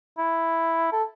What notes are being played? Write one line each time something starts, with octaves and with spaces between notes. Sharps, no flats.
E4
A4